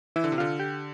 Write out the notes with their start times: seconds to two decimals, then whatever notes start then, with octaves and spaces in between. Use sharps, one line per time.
0.16 E3 E4
0.24 D3
0.32 C3
0.38 D3 F4
0.60 G4